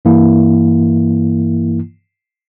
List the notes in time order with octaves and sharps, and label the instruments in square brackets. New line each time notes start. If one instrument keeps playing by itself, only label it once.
[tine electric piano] G2 E3 A#3 E4